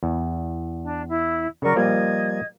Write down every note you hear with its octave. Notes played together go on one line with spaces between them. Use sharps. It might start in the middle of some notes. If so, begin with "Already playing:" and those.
E2
D4
E4
C#3 F#3 A#4 D5 C#6
F3 G3 A#3 D#5 G#6